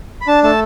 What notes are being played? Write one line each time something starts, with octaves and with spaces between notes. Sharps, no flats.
B5
D4 A5
A3 A5